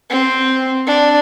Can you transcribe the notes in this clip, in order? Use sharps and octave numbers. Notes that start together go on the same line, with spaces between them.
C4
D4